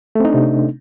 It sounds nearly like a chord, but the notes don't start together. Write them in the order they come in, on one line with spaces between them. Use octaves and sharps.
A3 C4 D#4 D4 C3